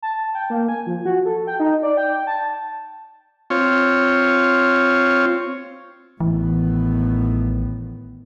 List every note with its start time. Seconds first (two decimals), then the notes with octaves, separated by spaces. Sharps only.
0.02 A5
0.35 G5
0.50 A#3
0.68 G#5
0.87 F3
1.05 F#4
1.25 A4
1.47 G5
1.60 D#4
1.83 D5
1.97 G5
2.27 A5
3.50 C4 F4 C#5
6.20 A1 A2 D#3 E3 B3